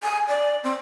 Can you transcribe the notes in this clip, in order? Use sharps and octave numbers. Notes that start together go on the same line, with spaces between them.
G#5
D5
C4